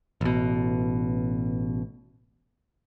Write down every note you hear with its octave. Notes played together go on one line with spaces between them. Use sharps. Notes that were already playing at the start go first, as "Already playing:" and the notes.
A1 B2